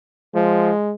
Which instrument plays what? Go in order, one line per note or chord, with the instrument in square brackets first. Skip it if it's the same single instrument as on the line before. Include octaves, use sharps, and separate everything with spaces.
[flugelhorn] F3 [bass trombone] G#3